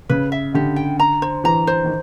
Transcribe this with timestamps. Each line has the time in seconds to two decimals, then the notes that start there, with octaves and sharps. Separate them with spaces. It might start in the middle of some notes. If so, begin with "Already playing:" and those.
0.09 C#3 B4
0.32 E5
0.54 D3 G4
0.76 G5
1.00 A#5
1.22 C5
1.44 E3 A#5
1.67 C5
1.84 D#3